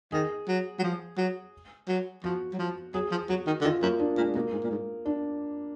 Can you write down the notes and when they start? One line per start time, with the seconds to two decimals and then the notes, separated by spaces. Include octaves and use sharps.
0.12 D#3 G#4
0.48 F#3
0.79 F#3
0.83 F3
1.17 F#3
1.88 F#3
2.24 F3 F#4
2.53 F#3
2.59 F3
2.94 F#3 G#4
3.11 F3
3.29 F#3 F#4
3.47 D#3
3.61 D3
3.64 D#3 F4
3.82 F#2 A#3
3.99 D4
4.17 A#2 G#3
4.35 B2 A#3
4.52 G#2
4.63 A#2
4.71 G#2
5.06 D4